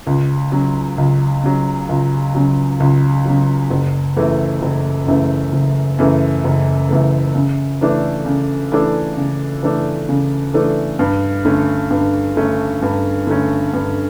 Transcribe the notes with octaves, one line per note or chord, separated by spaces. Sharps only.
C#2
C#3 F#3
C#2
C#3 F#3
C#2
C#3 F#3
C#2
C#3 F#3
F#1
F#2 C#3 E3 A3
F#1
F#2 C#3 E3 A3
F#1
F#2 C#3 E3 A3
F#1
F#2 C#3 E3 A3
C#3
E3 A3 D4 A4
C#3
E3 A3 D4 A4
C#3
E3 A3 D4 A4
C#3
E3 A3 D4 A4
G2
D3 A3 C#4
G2
D3 A3 C#4
G2
D3 A3 C#4
G2